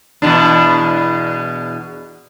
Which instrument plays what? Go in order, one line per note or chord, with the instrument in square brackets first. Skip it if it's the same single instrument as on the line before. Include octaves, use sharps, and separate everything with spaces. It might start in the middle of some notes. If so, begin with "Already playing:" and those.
[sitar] E2 B2 D4